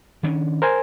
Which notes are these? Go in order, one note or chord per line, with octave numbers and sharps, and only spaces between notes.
D#3 C#4 D4
A#4 C5 G#5